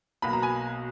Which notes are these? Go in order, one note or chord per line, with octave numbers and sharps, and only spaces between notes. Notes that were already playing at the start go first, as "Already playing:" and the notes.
B1 B2 F#3 A#3 B5
A#5
G#5 B5